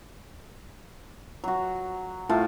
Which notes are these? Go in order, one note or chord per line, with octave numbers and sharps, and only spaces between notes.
F#3 F#4
A2 F4 A5